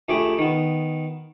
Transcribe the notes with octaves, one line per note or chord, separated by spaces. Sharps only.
A#1 A3 G4 G#4 G5 B5
D#3 B3